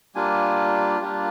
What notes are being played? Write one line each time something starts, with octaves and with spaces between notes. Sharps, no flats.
G3 A#3 D4 F4 G#5
G3 A#3 D4 F4